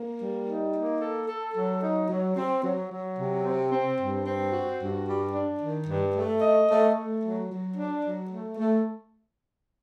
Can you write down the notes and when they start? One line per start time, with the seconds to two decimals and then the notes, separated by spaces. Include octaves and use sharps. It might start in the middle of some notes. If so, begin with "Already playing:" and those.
Already playing: A#3
0.19 G3
0.47 D#4
0.74 A#3
1.01 A4
1.28 A4
1.55 F#3
1.82 D#4
2.09 F#3
2.37 C4
2.62 F#3
2.89 F#3
3.18 C3
3.44 C4
3.72 C4
3.99 G2
4.25 C4
4.52 F#4
4.80 G2
5.07 G3
5.33 D4
5.60 D#3
5.87 G2
6.15 A3
6.41 D#5
6.69 A3
6.95 A3
7.22 F#3
7.50 F#3
7.77 D4
8.04 F#3
8.31 A3
8.58 A3